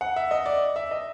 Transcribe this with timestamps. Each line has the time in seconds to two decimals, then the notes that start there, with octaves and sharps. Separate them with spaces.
0.01 F#5
0.16 E5
0.31 D#5
0.46 D5
0.76 E5
0.91 D#5